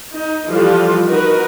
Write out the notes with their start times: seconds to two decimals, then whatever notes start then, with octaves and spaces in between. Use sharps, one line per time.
0.14 D#4
0.48 E3 F3 G3 F4 A4
1.07 D#4 F#4 A#4 B4